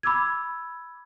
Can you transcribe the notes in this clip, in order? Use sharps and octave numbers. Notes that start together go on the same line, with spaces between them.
B5 D6 E6 G#6